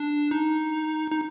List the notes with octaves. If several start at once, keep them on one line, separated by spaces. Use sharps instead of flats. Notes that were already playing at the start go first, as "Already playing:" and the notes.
Already playing: D4
D#4
D#4